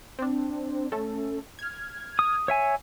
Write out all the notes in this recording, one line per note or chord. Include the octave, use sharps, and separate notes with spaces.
C4 D4
A3 C#4 A4
F6 G#6
D#6
C#5 E5 G#5